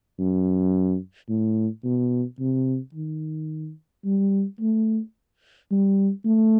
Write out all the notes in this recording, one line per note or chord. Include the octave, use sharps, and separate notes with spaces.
F#2
A2
B2
C3
D#3
G3
A3
G3
A3